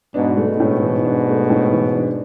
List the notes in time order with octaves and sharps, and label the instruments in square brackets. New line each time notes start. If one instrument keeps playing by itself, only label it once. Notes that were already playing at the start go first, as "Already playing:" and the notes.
[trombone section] G#2 B2 [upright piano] D4
[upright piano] A3
[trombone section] G#2 B2
[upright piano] A2
E3
D4
A3
A2
E3
D4